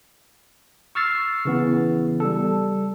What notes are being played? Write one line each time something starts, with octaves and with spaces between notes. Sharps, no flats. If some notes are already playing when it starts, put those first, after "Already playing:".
C#6 E6 F6 A6 C7
C#3 E3 B3
G3 A4